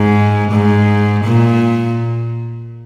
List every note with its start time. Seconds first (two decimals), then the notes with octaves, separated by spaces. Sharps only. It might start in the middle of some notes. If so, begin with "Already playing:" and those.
Already playing: G#2
0.52 G#2
1.24 A#2